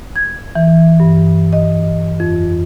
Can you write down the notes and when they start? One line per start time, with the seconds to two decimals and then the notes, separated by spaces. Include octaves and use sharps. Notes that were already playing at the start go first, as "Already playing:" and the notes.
0.16 G#6
0.56 E3
1.00 G2
1.53 D#5
2.20 F2